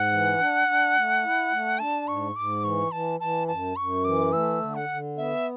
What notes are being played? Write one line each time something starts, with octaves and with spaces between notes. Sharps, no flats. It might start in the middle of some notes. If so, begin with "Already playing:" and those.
Already playing: G#2 F#5
E3
D4
D4
A3
E4
A3
D4 A5
G#2 C#6
G#2 D6
E3 C#6
E3 A5
E3 A5
F#2 A5
F#2 C#6
E3 D6
A3 E6
D3
F#5
D3
B3 E5